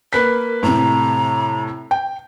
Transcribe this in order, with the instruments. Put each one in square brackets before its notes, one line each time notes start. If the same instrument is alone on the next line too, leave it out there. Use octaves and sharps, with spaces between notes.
[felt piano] A#3 B4 B6 [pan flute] A#4
[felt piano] A2 C3 [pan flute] A#5
[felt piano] G5